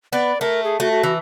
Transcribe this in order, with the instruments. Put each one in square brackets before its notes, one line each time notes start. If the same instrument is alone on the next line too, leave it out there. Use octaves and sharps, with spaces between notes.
[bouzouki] B3 [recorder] D5
[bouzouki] A3 [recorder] A#4
[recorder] G#4
[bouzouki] A3 [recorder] F#4
[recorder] F#4
[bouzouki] E3